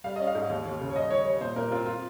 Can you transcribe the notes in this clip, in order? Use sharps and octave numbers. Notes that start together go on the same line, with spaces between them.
G3 F5
C#4 D#5
F5
G#2
D#2
D#2
C#3
C#5
G3 D#5
D#3 C#5
G3 C#5
A#2 C5
A#2 A#4
C4 F4
F4